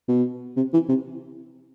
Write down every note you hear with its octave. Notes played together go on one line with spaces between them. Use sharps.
B2
C3
E3
C3